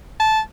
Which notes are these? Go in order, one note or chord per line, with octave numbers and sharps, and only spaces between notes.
A5